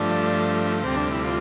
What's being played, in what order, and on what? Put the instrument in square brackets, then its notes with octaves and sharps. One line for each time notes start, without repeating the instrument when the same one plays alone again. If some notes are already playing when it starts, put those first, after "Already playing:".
Already playing: [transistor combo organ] G2 F3 A3 D4
D2 C3 G3 C4
D4
E4
F4